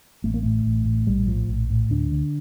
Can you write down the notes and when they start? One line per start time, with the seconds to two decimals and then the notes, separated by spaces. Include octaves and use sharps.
0.24 A1 A3
0.34 A#3
0.43 A2 A3
0.66 A1
0.86 A2
1.07 A#1 G3
1.28 A2 F3
1.48 A#1
1.70 A2
1.90 D2 D4
2.12 D3